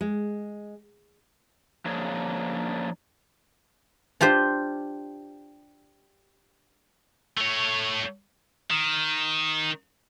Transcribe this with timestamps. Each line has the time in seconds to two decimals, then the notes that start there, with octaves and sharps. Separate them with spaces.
0.01 G#3
1.85 F3 A#3 C#4 D4 G#4 C#5
4.21 D4 F4 G4 C5
7.38 A3 C#5
8.71 D#3